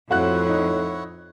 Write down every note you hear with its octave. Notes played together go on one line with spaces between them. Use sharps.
F2 A2 E4 F#4 C#5 F#5 F#6
D#4